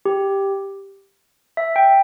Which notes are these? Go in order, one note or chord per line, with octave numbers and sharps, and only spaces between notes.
G4
E5
G5